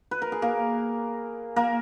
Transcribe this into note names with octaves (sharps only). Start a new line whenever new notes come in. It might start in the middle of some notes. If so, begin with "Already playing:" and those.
B4
A#4
G#4
A#3 A#4
A#3 A#4